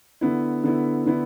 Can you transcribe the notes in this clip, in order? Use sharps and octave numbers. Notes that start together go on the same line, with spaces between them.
D3 B3 E4
D3 B3 E4
D3 B3 E4